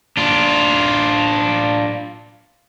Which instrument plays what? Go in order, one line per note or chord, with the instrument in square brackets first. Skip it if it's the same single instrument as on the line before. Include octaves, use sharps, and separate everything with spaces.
[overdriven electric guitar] D4 F4